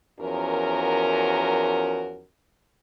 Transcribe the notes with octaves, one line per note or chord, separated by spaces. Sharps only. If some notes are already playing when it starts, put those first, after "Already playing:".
E2 F3 C#4 F#4 A#4